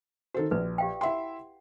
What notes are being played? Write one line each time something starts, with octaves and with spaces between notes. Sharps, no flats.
D#3 F#4 A4 C5
A#1 B4
G4 F5 G5
E4 E5 F#5 G5 C6